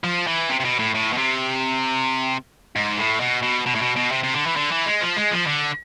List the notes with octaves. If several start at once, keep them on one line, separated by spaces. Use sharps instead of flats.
F3
E3
C3
C3
B2
A2
A2
B2
C3
G#2
A2
B2
B2
B2
A2
B2
B2
C3
C3
D3
E3
D3
E3
G#3
F3
G#3
F3
D3